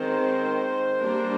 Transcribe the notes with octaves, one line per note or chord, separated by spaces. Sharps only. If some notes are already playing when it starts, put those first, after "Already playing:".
Already playing: D#3 G#3 C4 C5
G3 A#3 D4